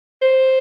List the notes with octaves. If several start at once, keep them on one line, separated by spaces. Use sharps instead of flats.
C5